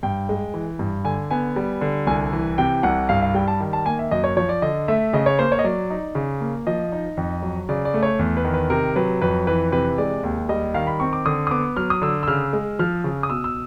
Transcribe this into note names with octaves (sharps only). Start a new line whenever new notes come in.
G2 G5
G#3
E3
G2
D3 G#5
B3 G#5
G3
D3
C2 G#5
E3
C3 G5
C2 F#5
G2 F5
F5
G3 G5
A5
D#3
A5
A#3 G#5
E5
F#2 D#5
C#5
F3 C#5
D5
D3 D#5
A3 E5
C#3 D#5
C#5
A#3 C5
C#5
D#5
F#3 D5
D#4
C#3
A#3
F3 D#5
D#4
F2
F#3
C#3 D5
D5
A3
C#5
E2
B4
D#3
B4
C3 A#4
F#3 B4
F2 B4
E3 B4
C3 B4
G#3 D5
D#2
G3 D#5
D#3 F5
B5
C4 C#6
D6
D3 D#6
D#6
B3 D6
F#3 F6
D#6
D3 E6
E6
C#3 F6
G#3
F3 F6
C#3
D#6
B2 E6
E6